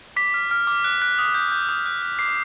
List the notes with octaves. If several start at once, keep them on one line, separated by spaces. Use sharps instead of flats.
D6 B6
F6
F6
D6
F#6
F#6
D#6
G6
G6
D#6
F#6
F#6
D6 C7